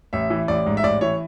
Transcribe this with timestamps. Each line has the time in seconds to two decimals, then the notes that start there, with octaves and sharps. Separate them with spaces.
0.13 A1 E5
0.30 E3
0.48 A1 D5
0.66 G#2
0.77 E5
0.83 A1 D5
1.01 E3 C#5